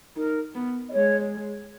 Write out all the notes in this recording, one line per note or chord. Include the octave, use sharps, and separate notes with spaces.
D#4 A#4
B3
D#5
G#3 C#5